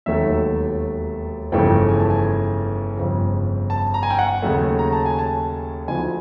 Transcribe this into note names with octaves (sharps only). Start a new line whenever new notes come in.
E1 D#2 D#3 F#3 A3 E5
G1 F2 C#3 E3 A3 G5
G#5
A5
G#5
G1 F2 C#3
A5
A#5
G#5
G5
F#5
D#2 C#3 F#3 A3
A#5
A5
G#5
A5
D2 D3 F3 G#5